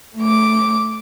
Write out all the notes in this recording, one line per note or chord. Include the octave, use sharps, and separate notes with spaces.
A3 D6